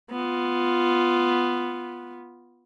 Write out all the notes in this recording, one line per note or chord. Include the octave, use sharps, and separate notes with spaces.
B3 F4